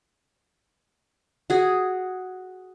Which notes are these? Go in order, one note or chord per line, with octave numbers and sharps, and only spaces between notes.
F#4 G#4